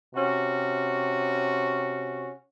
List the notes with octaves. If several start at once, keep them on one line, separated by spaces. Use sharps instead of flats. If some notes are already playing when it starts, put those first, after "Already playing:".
C3 C#4 F#4